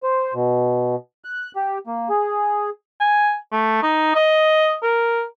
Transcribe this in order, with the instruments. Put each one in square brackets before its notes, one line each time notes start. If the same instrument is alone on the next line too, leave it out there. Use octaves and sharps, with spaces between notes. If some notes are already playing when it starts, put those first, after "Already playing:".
[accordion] C5
B2
F#6
G4
A#3
G#4
[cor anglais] G#5
A3
D#4
D#5
A#4